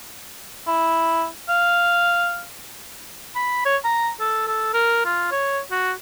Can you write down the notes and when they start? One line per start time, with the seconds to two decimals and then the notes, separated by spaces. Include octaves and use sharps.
0.67 E4
1.49 F5
3.36 B5
3.65 C#5
3.84 A#5
4.20 A4
4.47 A4
4.74 A#4
5.05 F4
5.31 C#5
5.71 F#4